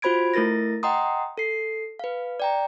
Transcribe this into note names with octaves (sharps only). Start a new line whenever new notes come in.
F4 F#4 C5 B5 G#6 D7
A3 E4 A#4 A6 A#6
D#5 F#5 G5 A#5 C6 D#6
A4 C7
B4 F5
D5 G5 A#5